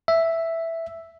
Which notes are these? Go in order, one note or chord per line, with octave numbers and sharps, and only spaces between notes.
E5